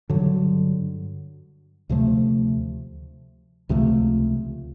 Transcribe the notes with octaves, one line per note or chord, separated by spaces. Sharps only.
G2 D3 F#3
D2 C3 F3 A3
C#2 C3 F3 A3